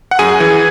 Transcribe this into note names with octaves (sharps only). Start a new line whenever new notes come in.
F#5
F#2 G#4 G#5
E3